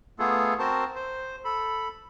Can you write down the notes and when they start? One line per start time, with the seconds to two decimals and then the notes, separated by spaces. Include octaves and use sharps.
0.19 A3 B3 F4 G#4 A4
0.59 C4 F#4 A#4 C5 A5
0.96 C5
1.45 A4 B5